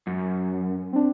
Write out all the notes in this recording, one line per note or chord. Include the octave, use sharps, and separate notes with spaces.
F#2
C4 D4